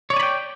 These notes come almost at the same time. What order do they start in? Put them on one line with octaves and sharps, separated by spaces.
C#5 D5 G#5 B5 G5